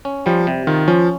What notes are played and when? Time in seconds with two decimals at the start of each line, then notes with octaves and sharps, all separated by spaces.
0.05 C#4
0.26 F3 G3
0.47 C3
0.67 D#3 F4
0.88 F3 C#4